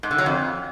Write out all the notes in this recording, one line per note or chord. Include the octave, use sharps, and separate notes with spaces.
G#2
D3
F#3
F2